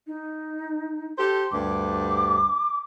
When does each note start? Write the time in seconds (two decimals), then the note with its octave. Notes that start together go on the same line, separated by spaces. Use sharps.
0.07 D#4
1.16 G4 A4 C5
1.52 D2 G2 D6